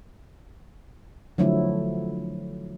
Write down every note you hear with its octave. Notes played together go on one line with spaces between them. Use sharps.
D3 F3 F#3 A3 E4